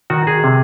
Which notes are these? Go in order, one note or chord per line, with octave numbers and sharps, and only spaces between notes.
D#3 F#4
G#4
C3